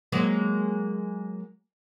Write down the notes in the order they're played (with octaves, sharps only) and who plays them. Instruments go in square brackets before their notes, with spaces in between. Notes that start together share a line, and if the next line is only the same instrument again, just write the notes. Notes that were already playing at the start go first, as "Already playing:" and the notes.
[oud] F#3 G#3 A#3